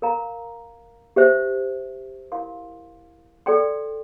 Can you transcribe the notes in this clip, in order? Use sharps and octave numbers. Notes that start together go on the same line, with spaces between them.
A#4 F5 A#5
G4 C5 E5
E4 A#4 F5 C6
A4 D5 G5 C6